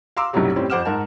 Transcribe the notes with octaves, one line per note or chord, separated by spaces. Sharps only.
F5 A#5 C6 D6 E6
B1 F#2 A2 C3 F#3 G3
A2 G3 C4 C#4
F2 C5 F#5 D6 F6 E7
G#2 A#4 F#5 A5